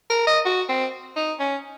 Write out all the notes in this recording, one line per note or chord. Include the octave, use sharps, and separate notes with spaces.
A#4
D#5
F#4
C4
D#4
C#4